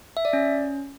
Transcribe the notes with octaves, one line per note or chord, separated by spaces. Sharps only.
E5
D5
C#4